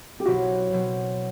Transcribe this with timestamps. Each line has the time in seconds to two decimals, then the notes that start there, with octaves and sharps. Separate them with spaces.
0.20 G4
0.25 B1 B2 F#3 C4 E4 F#4
0.73 B2 F#3 C4